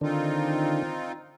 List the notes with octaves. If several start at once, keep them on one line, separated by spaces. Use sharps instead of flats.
D3 D#3 C4 D4 D#4 F4